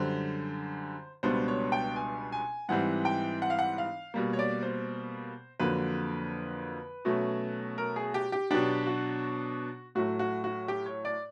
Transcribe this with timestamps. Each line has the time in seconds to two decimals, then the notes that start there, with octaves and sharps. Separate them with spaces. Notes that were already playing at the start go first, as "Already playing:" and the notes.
Already playing: F#2 D3 G3 C5
1.23 C#2 B2 G3 B3 D4 C5
1.48 C#5
1.72 G5
1.96 G#5
2.32 G#5
2.69 G#2 E3 G3 C4 F#5
3.05 G5
3.42 F#5
3.50 F5
3.59 F#5
3.78 F5
4.14 B2 G3 A#3
4.33 C#5
4.39 D5
4.63 C5
5.60 F2 D3 F#3 A#3 B4
7.05 B2 F#3 A3 C#4
7.78 A#4
7.96 G#4
8.14 G4
8.32 G4
8.51 B2 F#3 B3 D4 G4
8.87 F#4
9.95 A2 F#3 A3 F#4
10.19 F#4
10.44 F#4
10.68 G4
10.86 C#5
11.05 D5